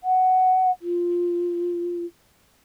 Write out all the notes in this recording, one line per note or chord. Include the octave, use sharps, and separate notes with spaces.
F#5
F4